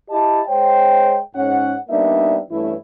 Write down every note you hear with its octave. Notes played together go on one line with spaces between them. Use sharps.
E4 G4 D#5 A5
G#3 C5 C#5 G5
G#2 C#4 F#5
G3 A#3 B3 D4 D#4 E5
G2 E3 A3 C#4 E4